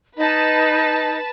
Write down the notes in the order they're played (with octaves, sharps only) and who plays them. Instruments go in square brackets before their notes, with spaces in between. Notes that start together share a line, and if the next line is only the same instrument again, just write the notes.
[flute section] D#4 D#5 [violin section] B4 A5